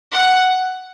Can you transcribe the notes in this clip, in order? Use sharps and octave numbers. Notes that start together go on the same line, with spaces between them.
F#5